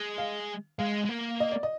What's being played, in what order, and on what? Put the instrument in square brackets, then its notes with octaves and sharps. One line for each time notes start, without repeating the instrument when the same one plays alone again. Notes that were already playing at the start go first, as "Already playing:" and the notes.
Already playing: [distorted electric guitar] G#3
[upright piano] F5
[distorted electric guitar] G#3 [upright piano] F5
[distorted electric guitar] G#3
A#3
[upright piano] D#5
D5
D#5